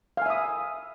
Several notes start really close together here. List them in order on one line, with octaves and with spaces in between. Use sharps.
F5 G#5 E5 D#6